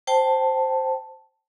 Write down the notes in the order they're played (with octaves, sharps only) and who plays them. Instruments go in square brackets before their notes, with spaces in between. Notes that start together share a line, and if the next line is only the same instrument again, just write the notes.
[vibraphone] C5 G5 A5